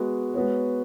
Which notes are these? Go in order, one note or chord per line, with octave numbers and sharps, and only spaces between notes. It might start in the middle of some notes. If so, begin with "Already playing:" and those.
Already playing: G#3 B3 F#4
G#3 B3 F#4 C#5